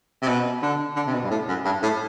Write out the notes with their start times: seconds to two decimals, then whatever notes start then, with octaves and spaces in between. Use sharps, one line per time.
0.22 C3
0.28 B2
0.62 D3
0.96 D3
1.07 C3
1.13 B2
1.24 G2
1.31 A2
1.48 F#2
1.65 G2
1.82 A2